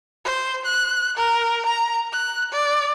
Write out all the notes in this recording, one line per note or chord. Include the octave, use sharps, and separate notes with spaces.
C5
F#6
A#4
A#5
F#6
D5